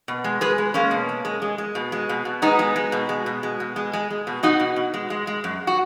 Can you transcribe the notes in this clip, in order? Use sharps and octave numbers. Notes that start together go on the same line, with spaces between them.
B2
G#3
G#3 G#4 B4
G#3
G#3 A#3 C#4
B2
G#3
G#3
G#3
G#3
B2
G#3
B2
B2
G#3 B3 D#4
G#3
G#3
B2
G#3
B2
G#3
B2
G#3
G#3
G#3
B2
B2 D#4 F#4
B2
B2
G#3
G#3
G#3
F#2
F#4